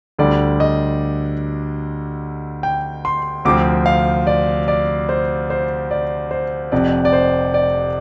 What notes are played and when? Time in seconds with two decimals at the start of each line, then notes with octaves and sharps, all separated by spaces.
0.18 D2 D3 G3 D5
0.60 D#5
2.63 G5
3.05 C6
3.45 D2 C3 F3 C4 D6
3.86 F5
4.27 D5
4.68 D5
5.09 C5
5.50 C5
5.91 D5
6.31 C5
6.72 F1 F2 C3 F3 D5
7.05 D5
7.13 C5
7.54 D5